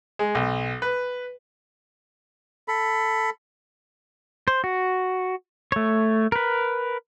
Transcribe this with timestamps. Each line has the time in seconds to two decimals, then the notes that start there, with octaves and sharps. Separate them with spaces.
0.19 G#3
0.35 B1
0.82 B4
2.68 A4 B5
4.48 C5
4.64 F#4
5.72 A3 C#5
6.32 A#4 B4